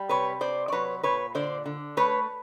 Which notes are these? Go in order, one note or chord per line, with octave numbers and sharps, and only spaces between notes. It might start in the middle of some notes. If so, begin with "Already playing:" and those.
Already playing: G3
C3 B4 C#5
C3 C5 D5
D5
F#3 B4 C#5
A#2 B4 C#5
D3 C5 D5
D3
A3 B4 C#5